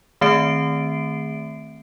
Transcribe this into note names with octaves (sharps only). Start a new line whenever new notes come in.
D#3 A3 C4 E5 C7 D7